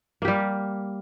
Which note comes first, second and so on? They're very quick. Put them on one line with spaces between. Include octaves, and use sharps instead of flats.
A#3 G4 G3